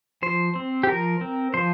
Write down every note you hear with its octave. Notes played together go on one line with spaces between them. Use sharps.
F3 C5
C4
G4
F3 A#4
C4
F3 C5